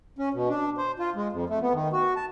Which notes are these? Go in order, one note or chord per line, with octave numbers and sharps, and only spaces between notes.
C#4
B2
D4
C5
F4
G#3
F2
A3
B3
D#3
F#4
A5